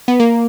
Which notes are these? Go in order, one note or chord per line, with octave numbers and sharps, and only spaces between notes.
B3
A#3